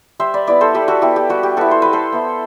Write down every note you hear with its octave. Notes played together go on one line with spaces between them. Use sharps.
G3 C5 E5
B4 D5
B3 E4 B4 D5
A4 C5
G3 G4 B4
F#4 A4
B3 E4 G4
G4
G3 F#4
G4
B3 E4 F#4 A4
C5
G3 B4
A4 C5
B3 E4